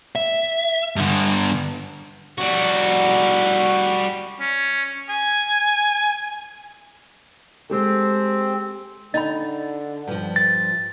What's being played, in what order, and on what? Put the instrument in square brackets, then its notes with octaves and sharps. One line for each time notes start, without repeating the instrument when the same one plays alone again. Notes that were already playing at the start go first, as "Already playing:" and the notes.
[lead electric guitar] E5
G2 D3
[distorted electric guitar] G3 F#4
[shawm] C#4
G#5
[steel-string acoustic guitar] G#3 G4 A4 [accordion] C4
[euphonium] D3 [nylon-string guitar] D#4 [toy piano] D#5 G5 B5
[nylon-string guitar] G2 F3
[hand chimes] A6